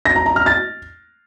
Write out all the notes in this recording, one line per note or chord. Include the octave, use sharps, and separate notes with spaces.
A#6
A#5
A#5
F6
A6